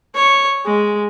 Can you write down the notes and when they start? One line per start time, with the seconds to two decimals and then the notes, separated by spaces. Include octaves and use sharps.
0.14 C#5
0.65 G#3